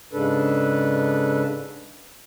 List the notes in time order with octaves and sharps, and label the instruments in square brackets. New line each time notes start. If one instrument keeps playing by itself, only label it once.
[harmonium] G#2 C#3 D4 A4 B4